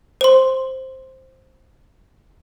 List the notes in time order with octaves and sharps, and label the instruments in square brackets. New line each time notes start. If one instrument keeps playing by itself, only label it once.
[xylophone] C5 C6